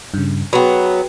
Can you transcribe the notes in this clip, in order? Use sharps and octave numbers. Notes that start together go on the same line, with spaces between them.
G2 C#3
F#3 B3 F#4 G#4 B4 G5